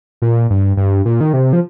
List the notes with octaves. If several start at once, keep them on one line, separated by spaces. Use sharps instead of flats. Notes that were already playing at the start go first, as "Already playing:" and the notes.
A#2
G2
G2
A#2
D#3
C3
F3